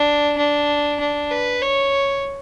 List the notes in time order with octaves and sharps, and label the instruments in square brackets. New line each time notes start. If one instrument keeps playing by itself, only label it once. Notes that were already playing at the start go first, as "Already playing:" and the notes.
Already playing: [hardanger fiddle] D4
D4
D4
B4
C#5